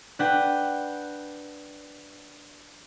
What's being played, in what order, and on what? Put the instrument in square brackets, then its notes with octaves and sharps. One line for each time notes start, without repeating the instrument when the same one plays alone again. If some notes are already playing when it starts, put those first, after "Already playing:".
[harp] D4 B4 F#5 G5